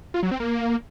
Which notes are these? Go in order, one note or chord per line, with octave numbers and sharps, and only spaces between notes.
F4
F#3
C4
A#3